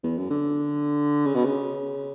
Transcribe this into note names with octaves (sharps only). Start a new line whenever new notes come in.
E2
F#2
D3
C#3
B2
C#3